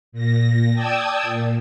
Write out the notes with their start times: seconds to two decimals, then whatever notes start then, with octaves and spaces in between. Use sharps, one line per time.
0.12 A#2 A#6
0.73 D5 G5 A5 D#6 E6 G#6
1.23 A#2